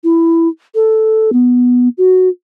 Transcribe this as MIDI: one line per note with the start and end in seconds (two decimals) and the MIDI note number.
0.04 0.48 64
0.75 1.31 69
1.33 1.88 59
1.98 2.29 66